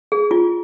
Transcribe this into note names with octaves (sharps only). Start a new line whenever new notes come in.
G#4
F4